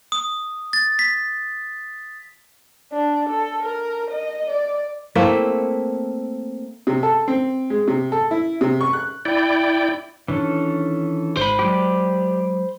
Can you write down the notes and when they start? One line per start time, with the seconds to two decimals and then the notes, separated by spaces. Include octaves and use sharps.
0.12 D#6
0.73 A6
0.99 B6
2.93 D4
3.29 A4
3.63 A#4
4.11 D#5
4.50 D5
5.15 A3 A#3 C4 E4
6.87 C3
7.03 A4
7.28 C4
7.70 G#3
7.88 C3
8.12 A4
8.31 E4
8.61 C3
8.81 C#6
8.93 F#6
9.25 E4 D5 G5
10.28 D#3 E3 C#4 D4 A4
11.37 G#1 C5 B5
11.59 F#3 G#3 G4 D5